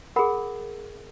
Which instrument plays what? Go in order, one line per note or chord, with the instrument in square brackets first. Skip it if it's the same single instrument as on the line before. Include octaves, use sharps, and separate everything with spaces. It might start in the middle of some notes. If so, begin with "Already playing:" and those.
[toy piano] G#4 A#4 [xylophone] F#5 B5